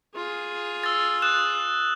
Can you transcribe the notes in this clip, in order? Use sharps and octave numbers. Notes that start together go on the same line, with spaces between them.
F4 G#4
E6 A6
D#6 F#6 E7